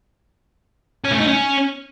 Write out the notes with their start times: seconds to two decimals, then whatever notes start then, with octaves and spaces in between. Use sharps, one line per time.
1.04 C#4
1.12 A3
1.20 D#4
1.28 C#4